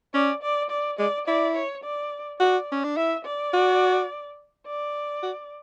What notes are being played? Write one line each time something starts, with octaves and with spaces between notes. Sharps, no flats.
C#4 D5
D5
D5
G#3 D5
E4 D5
C#5
D5
F#4 D5
C#4
D4
E4 E5
D5
F#4
D5
F#4